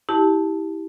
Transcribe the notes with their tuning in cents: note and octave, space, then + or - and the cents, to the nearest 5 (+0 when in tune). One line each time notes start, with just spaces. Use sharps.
E4 -25 G4 +0 A5 -5